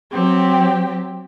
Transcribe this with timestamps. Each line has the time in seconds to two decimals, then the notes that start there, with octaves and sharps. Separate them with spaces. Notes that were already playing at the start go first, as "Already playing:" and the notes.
0.13 F#3 C4 G4 G5